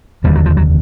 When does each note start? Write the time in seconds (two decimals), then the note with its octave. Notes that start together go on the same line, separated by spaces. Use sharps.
0.24 F1 D#2 D3 G3
0.35 F#3
0.46 F3
0.57 F#3